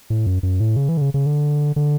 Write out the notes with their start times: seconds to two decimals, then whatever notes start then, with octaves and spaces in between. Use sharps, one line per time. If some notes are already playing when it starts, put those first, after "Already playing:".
0.10 A2
0.26 F#2
0.43 F#2
0.60 A2
0.76 C#3
0.89 E3
0.97 D3
1.01 C#3
1.14 C#3
1.26 D3
1.76 D3